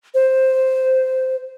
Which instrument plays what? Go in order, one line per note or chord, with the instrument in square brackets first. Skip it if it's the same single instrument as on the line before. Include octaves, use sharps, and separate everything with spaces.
[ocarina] C5